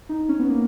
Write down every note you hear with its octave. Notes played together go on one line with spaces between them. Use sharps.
D#4
C#4
B3
A#3